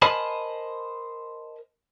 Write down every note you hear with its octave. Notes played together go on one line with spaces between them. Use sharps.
A#4 C5 D#5 G#5 A5 B5